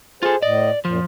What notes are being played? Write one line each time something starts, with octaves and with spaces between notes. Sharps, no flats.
F4 G#4 A4 C5
A2 D5 D#5
F#2 A#2 F3